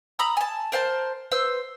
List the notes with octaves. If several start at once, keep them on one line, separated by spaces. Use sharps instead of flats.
A#5 B5 D#6 E6
G#5 A5
A#4 C5 F5 A5
B4 C5 E6